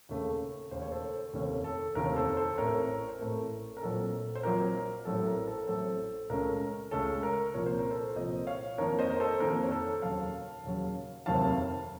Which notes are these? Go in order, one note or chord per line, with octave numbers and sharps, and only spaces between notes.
D#2 C#3 A3
D#2 C#3 A3 C5
C#5
A4 C5
F1 D#2 D#3 A3 C#4
A4
F1 D#2 D#3 A3 C#4 A#4
A4 C5
A4 C5
A1 A2 A3 C4 A#4 C#5
C5
A1 A2 A3 C4 A#4
A#4
A#1 A#2 F#3 C4 A4
C5
A#1 A#2 F#3 C4 A#4
A1 A2 F#3 C4 A4
A#4
A4 C5
A1 A2 F#3 C4 A4 C5
C#2 C#3 A3 C#4 A#4
C#2 C#3 A3 C#4 A4
A#4
C2 A#2 F3 A#3 C#5
C5
A#4
A4 C5
C2 A#2 F3 A#3 C5 D#5
C#5 F5
F2 D#3 A#3 A#4 C#5
C5 D#5
A#4
A4 C5
F2 D#3 A#3 A#4
C#5
A4 C5
D#2 C#3 F#3 F5 A5
D#2 C#3 F#3
F1 D#2 D#3 F#3 C4 F5 A5